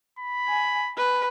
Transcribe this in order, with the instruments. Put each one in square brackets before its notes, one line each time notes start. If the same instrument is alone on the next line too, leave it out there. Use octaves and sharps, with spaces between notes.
[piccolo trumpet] B5
[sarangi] G#5
B4